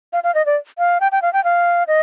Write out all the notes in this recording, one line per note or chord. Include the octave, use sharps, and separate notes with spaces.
F5
F5
D#5
D5
F5
G5
G5
F5
G5
F5
D#5